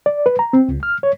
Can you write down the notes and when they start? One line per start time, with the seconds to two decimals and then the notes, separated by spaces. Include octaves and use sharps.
0.06 D5
0.26 B4
0.39 A#5
0.53 C4
0.69 C#2
0.83 F6
1.03 C#5